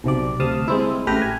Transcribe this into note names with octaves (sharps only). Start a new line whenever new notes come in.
B1 C3 D5
D2 C3 F5 A5 D#6
G#3 C4 E4
A1 A3 G4 B4 F6 A#6
G#5